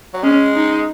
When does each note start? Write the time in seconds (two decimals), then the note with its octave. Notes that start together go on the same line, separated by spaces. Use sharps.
0.14 F#3
0.23 G#3 C#4
0.55 D#4